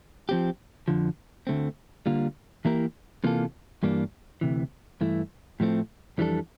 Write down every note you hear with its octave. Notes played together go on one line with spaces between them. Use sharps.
F3 C4 G4
F2 D3 F3
D2 D3 A3 C4
D3 G3 A#3 F4
E3 A#3 E4 G4 A#4
C3 E3 A#3 F4 A4
G2 E3 G3 A#3 D4
D2 C3 E3
G2 E3 A3 E4
A2 F3 A3 C4
F2 E3 G3 D4 A4